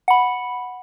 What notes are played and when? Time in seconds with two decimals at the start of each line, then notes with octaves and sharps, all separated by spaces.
0.08 F#5 B5